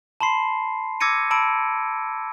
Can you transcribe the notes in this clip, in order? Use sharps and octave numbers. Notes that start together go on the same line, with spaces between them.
A5 B5 C6 C7
D6 E6 G#6 A#6 C#7 D#7
A5 B5 E6 D7